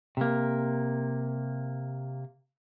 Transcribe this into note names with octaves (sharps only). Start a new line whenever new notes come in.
C3 A#3